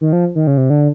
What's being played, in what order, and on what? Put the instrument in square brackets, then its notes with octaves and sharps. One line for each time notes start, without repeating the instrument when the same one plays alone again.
[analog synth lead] D#3
F3
D#3
C#3
C3
D3